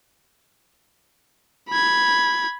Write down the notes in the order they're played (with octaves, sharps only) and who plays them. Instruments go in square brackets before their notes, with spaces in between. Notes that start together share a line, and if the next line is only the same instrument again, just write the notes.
[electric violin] B5 G#6